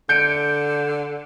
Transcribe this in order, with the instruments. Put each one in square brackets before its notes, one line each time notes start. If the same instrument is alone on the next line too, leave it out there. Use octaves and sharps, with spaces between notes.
[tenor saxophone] D3 [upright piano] G6 C#7 D7